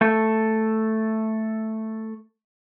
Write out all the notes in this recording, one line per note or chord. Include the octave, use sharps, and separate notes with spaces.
A3 A4